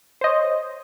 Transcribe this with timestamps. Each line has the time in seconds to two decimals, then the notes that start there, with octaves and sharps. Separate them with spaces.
0.21 C5
0.24 D#5
0.27 C#5